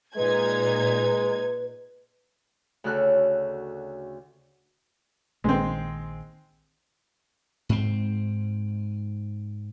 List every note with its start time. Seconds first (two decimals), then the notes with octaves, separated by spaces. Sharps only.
0.16 A#2 G#3 D#4 B4 G#6
2.84 D2 C#3 F#4 A4 F6 F#6
5.44 A#1 D#3 G#3 C4
7.69 G#2 C4